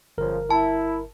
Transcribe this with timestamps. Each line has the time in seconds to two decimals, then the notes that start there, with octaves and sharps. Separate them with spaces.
0.18 G1 C#2 F3 A#4
0.50 E4 A5